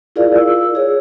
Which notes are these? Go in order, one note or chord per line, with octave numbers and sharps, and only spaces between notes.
E4 F4 G#4 A#4 D5 F5
E6
G#4 C#5